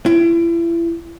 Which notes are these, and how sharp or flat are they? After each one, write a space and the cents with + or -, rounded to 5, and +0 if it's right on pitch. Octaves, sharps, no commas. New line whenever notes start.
E4 +35